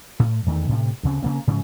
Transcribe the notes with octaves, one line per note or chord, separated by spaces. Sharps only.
A2
E2 D#3 E3 A3
A2 C3
D2 C#3 C4
C#3 A#3 C4
G#2 C#3 F3